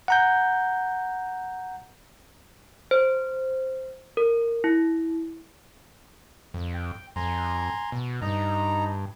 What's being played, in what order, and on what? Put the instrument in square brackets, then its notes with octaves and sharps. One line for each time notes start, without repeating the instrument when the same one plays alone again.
[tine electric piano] F#5 A#5 G6
[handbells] C5
A#4
E4
[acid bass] F2
[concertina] G5
[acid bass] F2 [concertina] G#5 A#5 C6
[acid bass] B2
[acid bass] G2 [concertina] D#4 A#5